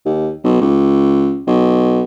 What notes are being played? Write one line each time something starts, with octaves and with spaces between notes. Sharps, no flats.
D#2
B1
C#2
B1